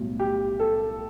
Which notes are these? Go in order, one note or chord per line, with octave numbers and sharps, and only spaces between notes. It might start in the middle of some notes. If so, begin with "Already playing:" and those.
Already playing: B1 A2 G3
G4
A4